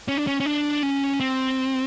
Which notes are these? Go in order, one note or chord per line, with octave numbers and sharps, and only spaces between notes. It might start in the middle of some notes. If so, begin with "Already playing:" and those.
C#4
D4
C#4
C#4
D4
C#4
C4